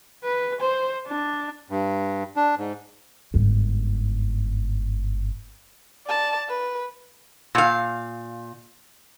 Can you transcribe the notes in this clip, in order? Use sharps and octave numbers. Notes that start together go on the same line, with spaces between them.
B4
C5
D4
G2
D4
G#2
G1 G#2
D5 A5
B4
A#2 F5